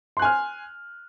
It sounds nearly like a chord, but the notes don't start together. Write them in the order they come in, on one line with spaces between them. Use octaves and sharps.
C6 F#6 G#5 F6